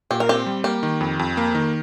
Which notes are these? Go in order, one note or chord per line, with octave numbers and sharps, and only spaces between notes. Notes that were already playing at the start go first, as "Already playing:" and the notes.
A#2 G4
A#4
C4 G4
G3
A#3 G4
D#3
F2
F2
A#3
D#3